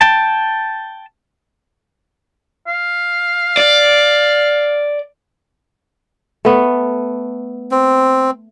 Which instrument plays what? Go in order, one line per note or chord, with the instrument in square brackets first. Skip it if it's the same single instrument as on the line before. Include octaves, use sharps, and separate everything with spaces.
[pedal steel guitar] G5 A5
[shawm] F5
[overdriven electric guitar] D5
[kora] A3 B3
[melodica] C4